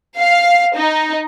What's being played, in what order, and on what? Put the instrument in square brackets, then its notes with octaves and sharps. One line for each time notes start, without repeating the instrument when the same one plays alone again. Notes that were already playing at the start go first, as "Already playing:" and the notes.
[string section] F5
D#4